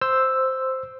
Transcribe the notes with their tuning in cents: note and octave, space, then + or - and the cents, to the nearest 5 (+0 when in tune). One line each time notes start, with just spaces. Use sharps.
C5 +0 E6 +0